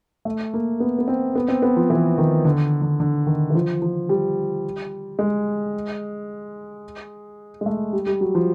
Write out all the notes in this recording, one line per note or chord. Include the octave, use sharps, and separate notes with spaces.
A3
A#3
B3
B3
C4
B3
C4
B3
F3
E3
D#3
D3
D3
D3
D#3
E3
F3
F3
G3
G#3
G#3
A3
G3
G3
F#3
F3